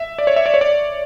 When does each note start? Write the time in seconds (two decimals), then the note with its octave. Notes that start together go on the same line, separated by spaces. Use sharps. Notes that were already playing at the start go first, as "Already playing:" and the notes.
Already playing: E5
0.18 D5
0.27 C#5
0.36 E5
0.46 D5
0.54 C#5
0.61 D5